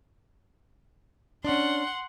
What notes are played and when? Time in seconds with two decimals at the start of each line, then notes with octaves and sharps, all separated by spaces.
1.45 C#4 D4 F#5 C6